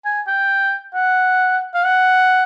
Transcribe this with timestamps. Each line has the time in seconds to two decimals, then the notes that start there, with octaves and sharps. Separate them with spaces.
0.05 G#5
0.27 G5
0.94 F#5
1.74 F5
1.85 F#5